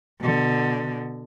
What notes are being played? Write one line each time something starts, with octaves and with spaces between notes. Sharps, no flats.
B2 D3